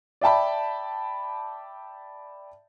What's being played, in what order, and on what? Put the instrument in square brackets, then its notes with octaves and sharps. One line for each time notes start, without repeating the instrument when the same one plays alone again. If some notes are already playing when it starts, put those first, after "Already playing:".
[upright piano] D5 E5 G5 A5 B5